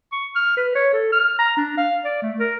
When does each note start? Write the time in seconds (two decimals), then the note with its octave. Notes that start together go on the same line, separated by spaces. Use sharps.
0.12 C#6
0.36 F6
0.57 B4
0.75 C#5
0.93 A4
1.12 F6
1.39 A#5
1.57 D4
1.77 F5
2.05 D5
2.22 A3
2.40 A#4